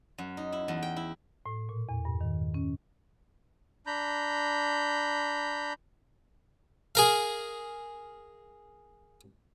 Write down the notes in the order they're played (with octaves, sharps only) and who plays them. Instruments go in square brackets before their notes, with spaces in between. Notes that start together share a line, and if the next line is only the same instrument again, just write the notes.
[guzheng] F#2
D#4
E4
E2
G5
E4
[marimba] A2
A#2
E2
G2
D#3
C#4
[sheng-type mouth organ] D4 A#5 B5 G6
[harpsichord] G#4 A#4 F5